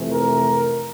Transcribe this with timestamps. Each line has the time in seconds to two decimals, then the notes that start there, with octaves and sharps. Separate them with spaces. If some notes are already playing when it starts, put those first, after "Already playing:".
Already playing: F2 C3 E3 A3
0.12 A#4